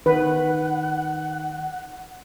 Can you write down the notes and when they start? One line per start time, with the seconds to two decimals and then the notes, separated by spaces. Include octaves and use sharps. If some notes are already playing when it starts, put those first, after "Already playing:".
0.06 D#3 B4 F#5